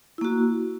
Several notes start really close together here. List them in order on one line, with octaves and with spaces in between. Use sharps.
E4 A#3 F#4